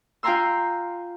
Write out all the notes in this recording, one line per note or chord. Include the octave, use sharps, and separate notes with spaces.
F4 G5 G#5 A#5 C6 E6